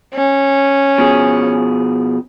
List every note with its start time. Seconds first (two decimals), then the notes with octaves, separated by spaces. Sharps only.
0.14 C#4
0.98 B2 F3 G#4